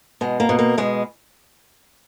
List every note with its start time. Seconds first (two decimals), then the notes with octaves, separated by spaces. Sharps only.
0.21 B2 G#3
0.40 A#3
0.49 B2
0.59 A#3
0.78 B2 G#3